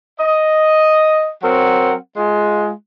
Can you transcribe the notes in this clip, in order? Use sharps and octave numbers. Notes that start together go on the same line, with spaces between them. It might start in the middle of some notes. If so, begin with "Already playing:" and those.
D#5
F#3 C4 A#4 F#5
G#3 F4